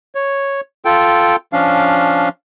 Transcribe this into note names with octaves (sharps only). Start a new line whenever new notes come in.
C#5
F4 A4 G5
F3 C#4 D4 F5